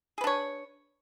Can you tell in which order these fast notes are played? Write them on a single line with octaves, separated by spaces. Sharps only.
G#4 B4 D4 C#5